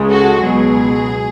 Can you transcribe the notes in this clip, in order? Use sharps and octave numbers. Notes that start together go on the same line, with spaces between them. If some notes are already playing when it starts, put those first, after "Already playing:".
Already playing: C#2 C#3 G#3
F#4 A4
C#2 B2 F#3 G#4